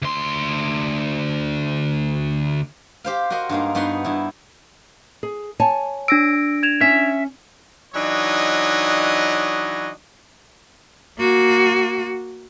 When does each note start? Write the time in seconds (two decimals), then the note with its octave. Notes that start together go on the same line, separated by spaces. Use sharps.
0.02 D2 C6
3.04 G4 C5 F5
3.30 F#4 A#4 C5 D#5 F#5
3.49 G2 G#3 A#3 D#4
3.75 G2 B3 D#4 F#4 F#5 C6
4.05 G2 E4
5.23 G#4
5.60 C#5 G#5 A5
6.08 D4 E6 A#6 D7
6.63 G#6 E7 F7
6.81 C#4 E5
7.95 E3 F#3 D4 D#4 C#5 D#5
11.19 A#3 F#4